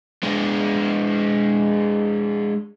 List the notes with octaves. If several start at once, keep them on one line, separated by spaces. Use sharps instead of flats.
G#3 D4